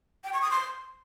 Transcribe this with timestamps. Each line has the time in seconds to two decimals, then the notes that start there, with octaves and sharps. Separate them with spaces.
0.24 G5
0.33 C#6
0.42 D#6
0.51 C6